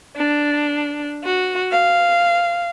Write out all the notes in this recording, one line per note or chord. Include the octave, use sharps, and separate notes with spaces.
D4
F#4
F5